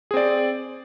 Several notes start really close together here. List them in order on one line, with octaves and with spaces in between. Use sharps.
G#4 C4 D5